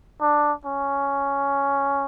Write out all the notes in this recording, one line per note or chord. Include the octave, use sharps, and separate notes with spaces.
D4
C#4